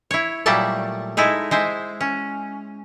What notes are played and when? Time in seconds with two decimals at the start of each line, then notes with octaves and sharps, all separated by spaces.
0.11 E4 C#5
0.46 A#2 F#3 G3 A3 D5 A5
1.17 G#3 D#4 E4 A4
1.51 G#3 C5 E5
2.01 C#4